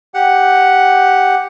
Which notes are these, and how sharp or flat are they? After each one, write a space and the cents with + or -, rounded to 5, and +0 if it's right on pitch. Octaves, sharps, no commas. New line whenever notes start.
G4 +0 F#5 +0